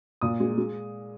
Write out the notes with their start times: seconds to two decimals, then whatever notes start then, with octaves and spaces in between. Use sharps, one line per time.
0.21 A#2 D#6
0.40 G#3
0.58 G#3